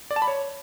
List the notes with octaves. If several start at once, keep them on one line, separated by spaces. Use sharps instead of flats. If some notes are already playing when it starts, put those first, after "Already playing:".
D5
A5
B5
C#5